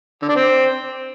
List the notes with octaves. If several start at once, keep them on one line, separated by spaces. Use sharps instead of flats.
D3
D4
C4